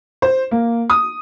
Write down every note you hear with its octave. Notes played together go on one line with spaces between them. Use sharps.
C5
A#3
D#6